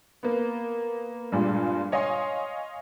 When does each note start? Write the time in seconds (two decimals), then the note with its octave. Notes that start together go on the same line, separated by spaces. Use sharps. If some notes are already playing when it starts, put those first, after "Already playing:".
0.23 A#3 B3
1.32 G2 A#2 G3 G#3
1.92 C#5 D#5 F5 G#5 C6